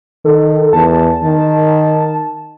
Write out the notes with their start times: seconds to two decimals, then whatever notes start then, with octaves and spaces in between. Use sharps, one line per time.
0.25 D#3 A4
0.73 E2 A5
1.24 D#3